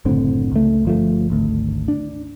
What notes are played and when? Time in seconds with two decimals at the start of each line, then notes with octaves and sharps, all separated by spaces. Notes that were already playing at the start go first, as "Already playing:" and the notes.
0.05 F#1 A2 D3 C4
0.52 C#2 A3
0.85 G1 F3 A3
1.30 G#1 D2
1.88 D4